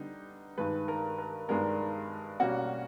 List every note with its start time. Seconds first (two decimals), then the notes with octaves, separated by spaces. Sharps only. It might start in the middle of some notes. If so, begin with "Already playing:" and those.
Already playing: D3 G3 B3 D#4
0.58 G2 D#3 G#3 B4
0.88 A#4
1.18 A#4
1.49 G2 D#3 G#3 B3 D4 A#4
2.40 B2 G3 A#3 C#4 F#4